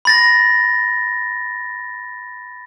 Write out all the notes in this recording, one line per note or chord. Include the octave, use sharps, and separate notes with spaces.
B5 A6 A#6